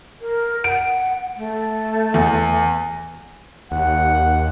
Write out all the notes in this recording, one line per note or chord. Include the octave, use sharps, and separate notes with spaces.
A#4
F#5 D7
A3
E2
D#2 F#5